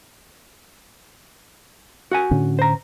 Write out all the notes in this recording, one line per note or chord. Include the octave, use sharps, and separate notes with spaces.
F#4 F#5 G#5
A2 D3 C#4
C5 A#5